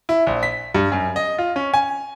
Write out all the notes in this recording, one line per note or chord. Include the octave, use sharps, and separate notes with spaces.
E4
A#1
B6
G2
F#2
D#5
F4
C#4
G#5